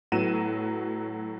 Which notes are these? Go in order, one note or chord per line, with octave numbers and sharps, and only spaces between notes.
A2 F#3 B3 D#7 E7